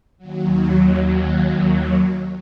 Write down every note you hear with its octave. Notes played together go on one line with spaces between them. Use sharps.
D#2 F#3